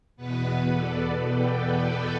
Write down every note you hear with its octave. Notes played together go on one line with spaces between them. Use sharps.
E2 B2 B3 B4
A4 D5
D5 G5
A4 D5